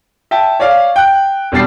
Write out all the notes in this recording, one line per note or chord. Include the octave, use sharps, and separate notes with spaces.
E5 G5 A5
C#5 D5 F5
G5 F#6
G#1 B2 G3 D4 A6 C7